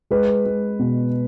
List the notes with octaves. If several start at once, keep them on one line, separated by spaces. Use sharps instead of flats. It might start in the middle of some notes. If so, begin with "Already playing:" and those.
G#3 B4
G#3
B2